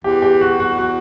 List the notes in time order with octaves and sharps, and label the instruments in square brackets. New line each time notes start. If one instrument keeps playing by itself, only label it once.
[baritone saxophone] E2 [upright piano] G4
[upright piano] G4
F#4
F#4
F#4